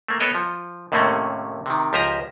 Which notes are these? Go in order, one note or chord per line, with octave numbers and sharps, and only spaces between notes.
A3 A#3
B3 A4 C#5 D#5 G5
F3
D#2 A2 C3 A3 A#3 C#4
C3 D#3
C#2 F3 G4 C5 G#5 A#5